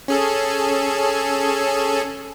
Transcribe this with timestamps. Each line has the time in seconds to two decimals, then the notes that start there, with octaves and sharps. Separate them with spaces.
0.08 C#4 G#4 A4